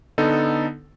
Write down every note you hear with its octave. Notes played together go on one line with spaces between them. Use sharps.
D3 B3 D#4 A4